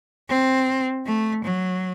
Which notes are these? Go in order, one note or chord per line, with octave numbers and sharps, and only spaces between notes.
C4
A3
F#3